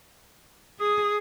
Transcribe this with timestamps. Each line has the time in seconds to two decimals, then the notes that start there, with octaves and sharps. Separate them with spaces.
0.79 G#4 D#6